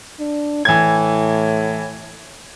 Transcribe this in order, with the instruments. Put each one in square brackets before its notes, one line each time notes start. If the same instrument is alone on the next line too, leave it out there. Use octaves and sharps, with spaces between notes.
[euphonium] D4
[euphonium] A2 [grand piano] E3 G#6